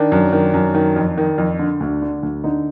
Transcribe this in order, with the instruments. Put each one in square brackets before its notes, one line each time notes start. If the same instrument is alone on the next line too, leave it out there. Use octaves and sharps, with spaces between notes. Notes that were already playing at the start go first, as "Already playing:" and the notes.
Already playing: [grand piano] D#3 D4
F#2
D#3
F#2
D#3
F2
D#3
F2
D3
D2
D3
D2
D3 D#4